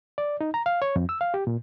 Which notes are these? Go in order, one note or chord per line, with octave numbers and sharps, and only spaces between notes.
D5
D#4
A#5
F5
C#5
F2
E6
F5
G4
A#2